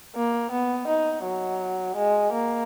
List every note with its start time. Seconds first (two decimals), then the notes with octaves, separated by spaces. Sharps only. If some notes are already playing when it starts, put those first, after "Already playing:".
0.15 A#3
0.52 B3
0.87 D#4
1.24 F#3
1.96 G#3
2.33 A#3